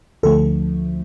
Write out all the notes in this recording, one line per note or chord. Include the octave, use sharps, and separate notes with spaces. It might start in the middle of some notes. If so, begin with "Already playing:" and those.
D2 D3 F3 A3 A4